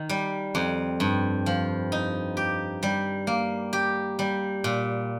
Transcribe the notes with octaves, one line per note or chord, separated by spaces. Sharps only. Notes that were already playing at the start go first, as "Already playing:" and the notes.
Already playing: D#3
G3
F2
G2
F3
D#4
G4
G3
A#3
G4
G3
A#2